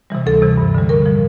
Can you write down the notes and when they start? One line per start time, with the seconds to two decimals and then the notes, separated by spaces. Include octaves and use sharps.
0.10 C3 E3 G3
0.26 D2 A4
0.42 C3 E3
0.57 G2
0.75 D3 G3
0.89 A2 A#4
1.06 F3